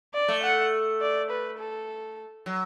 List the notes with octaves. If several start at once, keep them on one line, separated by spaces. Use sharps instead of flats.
D5
A3
F#5
D5
B4
A4
F#3